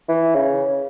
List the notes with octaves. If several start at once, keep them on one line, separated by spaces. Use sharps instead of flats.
E3
C#3